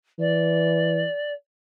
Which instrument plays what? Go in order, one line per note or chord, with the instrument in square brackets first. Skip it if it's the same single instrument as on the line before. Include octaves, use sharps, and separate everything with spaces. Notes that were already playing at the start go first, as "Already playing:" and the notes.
[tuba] E3 [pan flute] D5